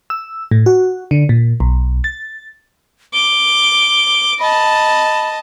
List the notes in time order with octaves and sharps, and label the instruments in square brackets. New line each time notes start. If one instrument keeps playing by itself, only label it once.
[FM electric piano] E6
A2
F#4
D3
A#2
B1
A6
[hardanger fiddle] D6 [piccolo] G7
[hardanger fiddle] D#5 A5 [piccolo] B5